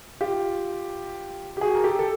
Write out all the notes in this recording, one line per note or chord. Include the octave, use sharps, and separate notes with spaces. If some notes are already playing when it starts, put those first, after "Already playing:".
F4 G4
G4
F#4 G#4
A#4
G4 A4
A4